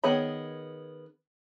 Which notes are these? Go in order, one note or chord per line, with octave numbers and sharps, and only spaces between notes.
D#3 B3 G#4 C#5 B5